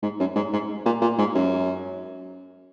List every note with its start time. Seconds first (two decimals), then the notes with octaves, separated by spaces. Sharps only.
0.03 G#2
0.20 F#2
0.36 G#2
0.53 G#2
0.85 A#2
1.01 A#2
1.18 G#2
1.35 F#2